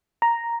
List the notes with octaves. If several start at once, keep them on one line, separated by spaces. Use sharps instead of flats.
A#5